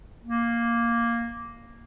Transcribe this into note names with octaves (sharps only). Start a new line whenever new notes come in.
A#3